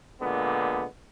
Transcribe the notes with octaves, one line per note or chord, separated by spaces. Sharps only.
A#2 D3 G#3 B3